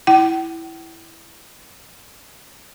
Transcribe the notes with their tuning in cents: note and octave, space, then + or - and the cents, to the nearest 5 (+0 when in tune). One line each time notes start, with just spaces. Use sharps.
E4 +0 G5 -45